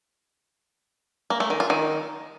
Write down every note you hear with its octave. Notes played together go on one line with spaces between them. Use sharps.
A#3
A3
D#3
F4
D#3